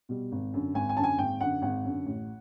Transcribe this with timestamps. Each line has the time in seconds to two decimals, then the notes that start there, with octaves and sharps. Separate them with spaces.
0.09 B2 G3
0.32 G#1
0.54 F#2 D3
0.74 G#1 G#5
0.89 G#5
0.97 F#2 D3 A5
1.03 G#5
1.18 G#1 G5
1.41 F#2 D3 F#5
1.62 G#1 F#5
1.84 F#2 D3
2.06 A1